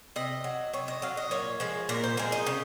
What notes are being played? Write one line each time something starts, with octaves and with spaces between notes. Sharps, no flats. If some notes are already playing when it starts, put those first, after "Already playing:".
C3 D#5
F#3
C3 C#5
D#5
F#3 F5
D#5
A#2 C#5
F3 G#3
A#2 A#4
C5
F3 G#3 A#4
D#4
C#3